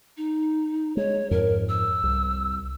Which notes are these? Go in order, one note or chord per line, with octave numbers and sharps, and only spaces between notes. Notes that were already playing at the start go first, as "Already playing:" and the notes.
D#4
G#3 C#5
F2 G#2 A#4
E6
C2